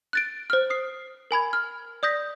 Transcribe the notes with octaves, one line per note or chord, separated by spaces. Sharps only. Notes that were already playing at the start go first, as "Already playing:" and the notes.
F#6 A6 D7
C5 F6
D#6 C7
A#4 G#5 B5 G#6
F6
D5 D#6 G6 A#6 B6